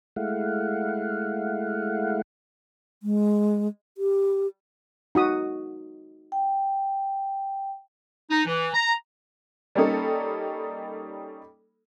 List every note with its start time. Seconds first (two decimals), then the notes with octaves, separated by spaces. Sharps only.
0.16 G#3 A3 E4 F5 F#5
3.03 G#3
3.98 G4
5.15 D#4 F#4 D#6
6.32 G5
8.30 D#4
8.46 E3
8.73 A#5
9.75 G3 A#3 C#4 D#4 A4